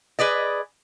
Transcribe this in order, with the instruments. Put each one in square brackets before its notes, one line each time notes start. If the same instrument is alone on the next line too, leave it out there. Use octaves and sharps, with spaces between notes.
[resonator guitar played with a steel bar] G#4 B4 D5 D#5